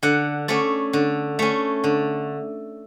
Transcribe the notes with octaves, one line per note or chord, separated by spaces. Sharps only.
D3 F#5
A3 C#4 D5
D3
A3 C#4
D3